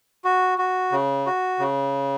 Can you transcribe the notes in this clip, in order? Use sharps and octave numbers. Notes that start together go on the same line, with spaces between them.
F#4
F#4
C#3
F#4
C#3